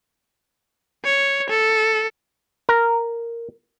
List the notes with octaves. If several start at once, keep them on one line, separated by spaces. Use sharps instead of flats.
C#5
A4
A#4